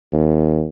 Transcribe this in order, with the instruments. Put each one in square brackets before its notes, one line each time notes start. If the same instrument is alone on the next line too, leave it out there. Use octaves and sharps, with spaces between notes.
[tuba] D#2